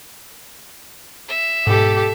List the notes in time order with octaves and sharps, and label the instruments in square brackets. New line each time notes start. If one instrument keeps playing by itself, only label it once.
[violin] E5
[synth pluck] G#2 B2 [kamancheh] G4 A4